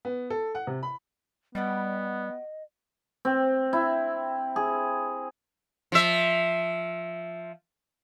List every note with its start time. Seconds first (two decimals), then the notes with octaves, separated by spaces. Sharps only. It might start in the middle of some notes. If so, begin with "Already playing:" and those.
0.05 B3
0.30 A4
0.55 F#5
0.67 C3
0.83 B5
1.55 G3 B3 F#4 G4 D#5 F#5
3.25 C4
3.73 E4
4.56 G#4
5.92 F3 E5